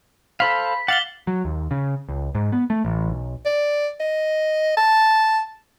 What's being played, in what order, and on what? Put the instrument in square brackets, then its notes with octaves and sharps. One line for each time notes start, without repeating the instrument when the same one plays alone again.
[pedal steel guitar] A4 C5 F5 [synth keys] B5 [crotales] B6
[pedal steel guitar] F5 F#5 [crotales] D6 F#7 G7 [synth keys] A6
[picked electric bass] F#3
D#2
C#3
C#2
G#2
B3
A3
A1
B1
[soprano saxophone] D5
D#5
A5